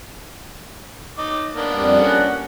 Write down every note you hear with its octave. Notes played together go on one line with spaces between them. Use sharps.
D#4 D6
A#3 B3 D4
F2 G3
C#4 F#5